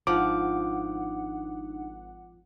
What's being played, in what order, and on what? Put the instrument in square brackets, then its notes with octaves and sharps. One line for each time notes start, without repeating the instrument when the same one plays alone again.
[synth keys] G#1 F#5 [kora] F3 [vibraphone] D4 D#4 [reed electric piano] D6